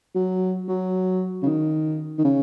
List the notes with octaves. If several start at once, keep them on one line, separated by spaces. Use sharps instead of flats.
F#3
F#3
C#3
D#3
D#3
C#3